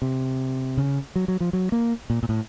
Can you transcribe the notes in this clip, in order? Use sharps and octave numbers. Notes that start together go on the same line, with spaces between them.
C3
C#3
F#3
F#3
F3
F#3
A#3
A#2
A#2
A2